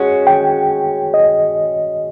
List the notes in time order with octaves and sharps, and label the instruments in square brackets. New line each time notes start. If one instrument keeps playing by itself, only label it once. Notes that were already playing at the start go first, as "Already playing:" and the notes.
Already playing: [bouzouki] G#3 C#4 F#4
[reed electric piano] G5
D#5